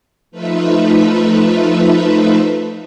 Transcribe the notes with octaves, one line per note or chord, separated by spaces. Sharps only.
F3 A3 D#4 F4 B4 E5